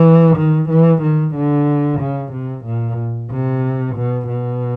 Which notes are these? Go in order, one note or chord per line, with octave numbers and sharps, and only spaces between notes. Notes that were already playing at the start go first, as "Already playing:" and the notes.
Already playing: E3
D#3
E3
D#3
D3
C#3
C3
A#2
C3
B2
B2